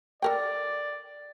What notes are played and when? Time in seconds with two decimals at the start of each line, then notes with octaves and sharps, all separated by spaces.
0.22 A4 A#4 D5 G5